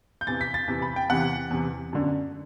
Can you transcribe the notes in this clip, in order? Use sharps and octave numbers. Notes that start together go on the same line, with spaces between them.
G6
E2 C3 E3 A6
B6
A6
E2 C3 E3
B5
G5
E2 C3 E3 F#5
E2 C3 E3
F#2 D3